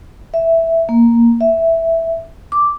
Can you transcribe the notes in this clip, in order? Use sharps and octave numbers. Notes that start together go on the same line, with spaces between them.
E5
A#3
E5
D6